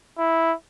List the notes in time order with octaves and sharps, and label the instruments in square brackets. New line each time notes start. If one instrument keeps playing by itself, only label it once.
[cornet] E4